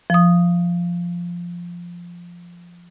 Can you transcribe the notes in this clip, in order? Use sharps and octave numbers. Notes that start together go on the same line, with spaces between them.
F3 D#6